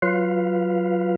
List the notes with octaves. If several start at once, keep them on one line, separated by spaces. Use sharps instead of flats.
F#3 F4 B4 F5